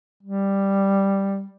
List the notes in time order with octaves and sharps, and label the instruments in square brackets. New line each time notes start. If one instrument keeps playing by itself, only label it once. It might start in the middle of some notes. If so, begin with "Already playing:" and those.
[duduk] G3